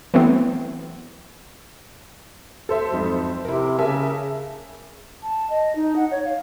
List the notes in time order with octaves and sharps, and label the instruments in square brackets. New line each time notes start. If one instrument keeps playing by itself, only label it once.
[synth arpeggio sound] E3 F#3 A3 B3 C4
[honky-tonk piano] A4 C5 E5
[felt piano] F2 G#2 F#3
[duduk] C3 [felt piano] E4 A#4
[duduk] C#3 [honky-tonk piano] A#4 E5 A5 [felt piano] G#5
[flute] A5
D#5
D#4
F#5
C#5
F5